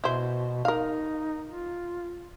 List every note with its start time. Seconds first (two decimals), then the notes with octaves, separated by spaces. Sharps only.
0.04 B2 E4 C5
0.65 D#4 A#4 F5
1.48 F4